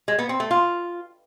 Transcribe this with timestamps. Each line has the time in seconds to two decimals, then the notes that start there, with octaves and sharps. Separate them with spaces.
0.08 G#3
0.19 B3
0.29 C4
0.40 A3
0.51 F4